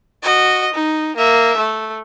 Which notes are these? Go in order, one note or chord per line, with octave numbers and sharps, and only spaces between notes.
F#4 D#5
D#4
A#3 E5
A3